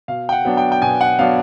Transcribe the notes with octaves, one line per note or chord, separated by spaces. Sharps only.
B2 F5
G5
F#5
F#3 B3 D4
G5
G5
B2 G#5
F#5
F#3 B3 D4 F5